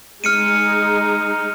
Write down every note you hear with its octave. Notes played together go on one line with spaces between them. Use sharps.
G#3 D#4 F6 C#7 D#7